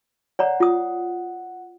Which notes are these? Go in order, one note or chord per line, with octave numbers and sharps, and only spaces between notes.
C#5 D5 F#5 A#5
F4 D#6